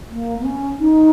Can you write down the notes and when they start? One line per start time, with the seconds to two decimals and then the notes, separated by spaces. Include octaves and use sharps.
0.10 A#3
0.40 B3
0.45 C#4
0.79 D#4